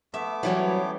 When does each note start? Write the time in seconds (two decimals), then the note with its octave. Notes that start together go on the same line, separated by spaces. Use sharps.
0.14 A3 B3 E5 D6
0.43 E3 F#3 G3 C#4 C5 C#5 F#5